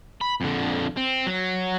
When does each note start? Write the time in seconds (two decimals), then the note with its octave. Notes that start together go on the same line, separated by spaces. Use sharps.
0.21 B5
0.41 F2 D3
0.97 C4
1.27 F#3